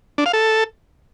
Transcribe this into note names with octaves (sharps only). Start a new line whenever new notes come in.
D4
F5
A4